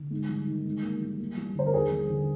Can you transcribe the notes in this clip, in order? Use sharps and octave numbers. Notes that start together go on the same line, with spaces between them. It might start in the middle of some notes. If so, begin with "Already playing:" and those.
Already playing: D3
G#2
G3
D#3
G#2
A#3
G3
A#3
G3
D3 C5
A#4
D#2 G#4
G3
D3